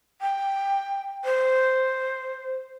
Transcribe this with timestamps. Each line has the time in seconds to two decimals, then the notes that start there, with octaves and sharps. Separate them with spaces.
0.22 G5
1.25 C5